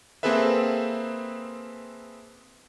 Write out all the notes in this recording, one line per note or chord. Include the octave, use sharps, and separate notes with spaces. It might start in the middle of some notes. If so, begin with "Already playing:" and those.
A#3 C4 G#4 A4 B4 E5